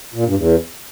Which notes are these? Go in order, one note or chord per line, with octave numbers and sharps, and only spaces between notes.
A#2
G2
E2